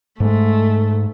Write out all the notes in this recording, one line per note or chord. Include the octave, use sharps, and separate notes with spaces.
G#2 G#3 A3